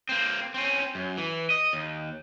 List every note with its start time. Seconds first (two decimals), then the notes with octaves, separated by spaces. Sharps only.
0.09 A#3 C4
0.54 C4 C#4
0.95 F#2
1.17 E3
1.50 D#5
1.73 D#2